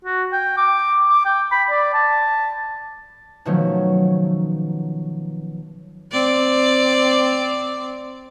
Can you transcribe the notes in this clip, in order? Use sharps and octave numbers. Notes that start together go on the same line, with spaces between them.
F#4
G5
D6
D6
G5
B5
D5
A5
B2 D#3 F3 F#3 A3 C#4
C4 D5